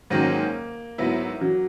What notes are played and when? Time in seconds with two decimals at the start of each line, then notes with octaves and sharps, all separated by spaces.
0.10 G#2 D#3 F#3 A#3 C#4
0.98 G#2 F#3 B3 E4
1.41 F#3